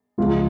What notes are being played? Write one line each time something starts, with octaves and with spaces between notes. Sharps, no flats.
C#2 C#3 F3 G#3 F4